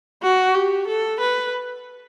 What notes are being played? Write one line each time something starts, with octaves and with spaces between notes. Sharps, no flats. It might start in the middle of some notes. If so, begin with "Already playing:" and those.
F#4
G4
A4
B4